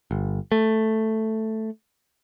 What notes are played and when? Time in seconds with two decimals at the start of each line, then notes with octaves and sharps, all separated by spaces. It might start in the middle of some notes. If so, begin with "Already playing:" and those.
0.11 G1
0.52 A3